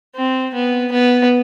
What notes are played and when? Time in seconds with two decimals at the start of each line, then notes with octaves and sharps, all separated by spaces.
0.15 C4
0.54 B3
0.92 B3